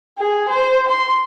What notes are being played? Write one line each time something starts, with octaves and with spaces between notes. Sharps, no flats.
G#4
C5
C6